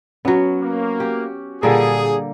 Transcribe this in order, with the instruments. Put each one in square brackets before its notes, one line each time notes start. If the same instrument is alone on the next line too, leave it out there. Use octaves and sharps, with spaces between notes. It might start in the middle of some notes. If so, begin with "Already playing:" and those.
[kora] F#3 B3 [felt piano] C#4 F#4
[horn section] A#3
[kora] G4
[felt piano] A#2 [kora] D3 G3 A#3 [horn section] G#4